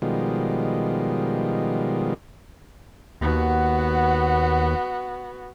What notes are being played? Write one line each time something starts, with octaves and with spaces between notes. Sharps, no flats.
B2 D#3 F3 G3 G#3
D#2 B3 F#4